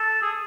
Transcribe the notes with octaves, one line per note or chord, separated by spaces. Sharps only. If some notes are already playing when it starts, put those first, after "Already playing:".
Already playing: A4
G#4